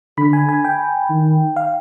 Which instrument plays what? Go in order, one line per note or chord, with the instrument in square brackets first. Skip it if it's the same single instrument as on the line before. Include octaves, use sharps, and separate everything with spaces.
[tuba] D3 [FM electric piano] B5
[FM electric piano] G#5
G#5
G5
[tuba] D#3
[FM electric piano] F5